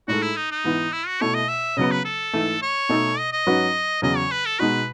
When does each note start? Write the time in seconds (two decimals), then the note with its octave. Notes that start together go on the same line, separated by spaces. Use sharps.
0.08 A2 G#3 D#4 F#4 A4
0.23 E4
0.36 D#4
0.51 D#4
0.64 G#2 E3 B3
0.92 E4
1.07 F#4
1.21 B2 A3 E4 C#5
1.35 D#5
1.48 E5
1.77 C#3 F#3 B3 D#5
1.91 B4
2.05 A4
2.33 G#2 E3 A3
2.62 C#5
2.89 B2 A3 D#4 A4
3.18 D#5
3.32 D#5
3.47 G#2 F#3 C#4 F#4 B4
4.02 E2 C#3 F#3 D#5
4.17 C#5
4.31 B4
4.45 A4
4.59 B2 G#3 D#4 F#4 B4